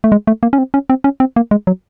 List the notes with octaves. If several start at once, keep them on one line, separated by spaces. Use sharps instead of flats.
A3
G#3
A3
A#3
C#4
C4
C#4
C4
C#4
C4
A#3
G#3
F#3